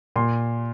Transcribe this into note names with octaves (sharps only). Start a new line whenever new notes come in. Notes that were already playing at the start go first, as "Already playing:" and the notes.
A#2 C6